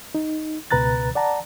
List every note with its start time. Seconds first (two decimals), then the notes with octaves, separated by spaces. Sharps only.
0.15 D#4
0.71 C#2 B2 B4 A#5 F#6 A6
1.15 D5 F#5 A5 A#5